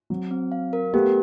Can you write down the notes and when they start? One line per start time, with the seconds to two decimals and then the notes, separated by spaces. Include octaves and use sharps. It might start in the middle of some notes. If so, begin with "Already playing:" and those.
0.10 F#3 C4
0.31 C4
0.52 F5
0.73 A#4
0.93 A3 B3 G4